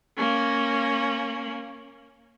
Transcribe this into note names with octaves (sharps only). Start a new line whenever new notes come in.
A#3 C#4